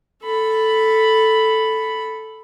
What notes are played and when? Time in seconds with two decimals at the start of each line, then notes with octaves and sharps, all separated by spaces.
0.23 A4 B5